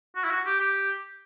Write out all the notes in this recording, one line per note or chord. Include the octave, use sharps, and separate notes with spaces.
F#4
E4
F#4
G4
G4